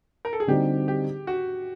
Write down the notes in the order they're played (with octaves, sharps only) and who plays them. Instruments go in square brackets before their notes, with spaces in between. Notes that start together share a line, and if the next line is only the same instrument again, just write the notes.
[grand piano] A#4
A4
G#4
[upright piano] D3 G3 C4 D#4 F#4 [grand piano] G4
[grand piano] G4
F#4